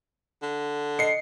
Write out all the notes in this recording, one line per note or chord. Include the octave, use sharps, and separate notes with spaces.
D3
D#5 C7 C#7